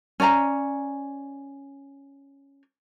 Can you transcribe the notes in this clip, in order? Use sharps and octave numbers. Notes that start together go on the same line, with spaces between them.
C#4 D5 G#5 A#5